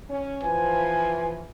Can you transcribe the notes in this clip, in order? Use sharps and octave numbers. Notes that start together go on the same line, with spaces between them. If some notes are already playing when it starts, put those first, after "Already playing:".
C#4
E3 F3 B4 G#5